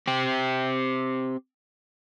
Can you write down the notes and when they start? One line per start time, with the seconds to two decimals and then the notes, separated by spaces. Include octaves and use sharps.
0.08 C4 G4